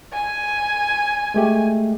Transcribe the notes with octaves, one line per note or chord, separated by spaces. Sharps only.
G#5
G#3 A3 G4